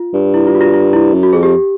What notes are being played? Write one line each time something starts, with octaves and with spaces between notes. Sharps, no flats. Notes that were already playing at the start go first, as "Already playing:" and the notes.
Already playing: F4
G2
E4
F4
F#4
F4
F4
E4
F#2
F#4
F2 G#4
G4